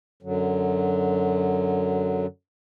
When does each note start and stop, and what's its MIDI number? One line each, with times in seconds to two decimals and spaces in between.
0.23 2.26 42
0.23 2.26 50
0.23 2.26 54